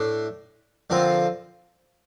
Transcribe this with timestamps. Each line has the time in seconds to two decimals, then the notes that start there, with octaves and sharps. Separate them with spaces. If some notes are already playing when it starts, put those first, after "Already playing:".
Already playing: A2 D4
0.90 D3 F3 C4 F4 A#4